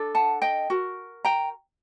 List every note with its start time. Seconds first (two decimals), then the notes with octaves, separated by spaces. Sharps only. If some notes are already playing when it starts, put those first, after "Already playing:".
Already playing: D4 A4
0.15 F#5 A5
0.42 D#5 G5
0.70 F#4 A#4
1.25 G5 A#5